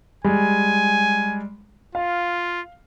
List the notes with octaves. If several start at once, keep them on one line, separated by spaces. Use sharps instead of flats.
G3 G#3 G#5
F4 F5